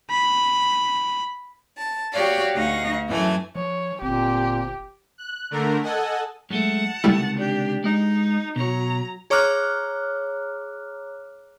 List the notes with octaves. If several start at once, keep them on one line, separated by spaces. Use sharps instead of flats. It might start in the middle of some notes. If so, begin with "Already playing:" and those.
B5
A5
F#4 G4 C#5 D5 F5
D2 D#4 F5 F#5 C#6 A#6
F#2 E3 A3 G#5
F3 C#5
G1 A#2 C4 G4
F#6
D3 A3 A#4
A4 D#5 F#5 G#5 A5
F#2 G#3 A3 F#5 A5
C#2 C3 D#3 G3 A3 E4
D4 G4
G#3 D#4 D#5
B2 F#3 C#5 A#5
G#4 C#5 A#5 D6 F6 F#6